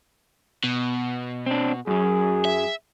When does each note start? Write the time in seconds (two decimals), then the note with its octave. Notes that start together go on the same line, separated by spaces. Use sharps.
0.64 B2
1.46 C4 D4
1.87 F#2 F#3 G#4
2.45 E5